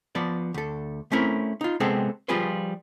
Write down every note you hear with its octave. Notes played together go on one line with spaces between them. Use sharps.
F3 B3 D5
D2 A4
A3 C4 C#4 E4 A#4
D#4 F4
C3 G#3 B3 C4 G#4 A4
F3 G3 F4 G#4 B4 C5